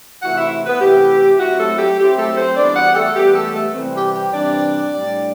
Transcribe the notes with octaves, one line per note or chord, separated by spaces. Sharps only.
C3 E3 A3 E4 F#4 F#5
E4 E5
B3 B4
C3 E3 A3 E4 G4
F#3 C4 E4 F#4
A3 A4
G4
F#3 C4 E4 G4
A3 A4
C4 C5
E3 G3 B3 D4 D5
F#4 F#5
G4
A3 A4
E3 G3 B3 G4
A3 A4
A3 A4
C3 E3 G3 C4
G4
G4
C3 E3 G3 C4 D4 D5
A2 G3 D4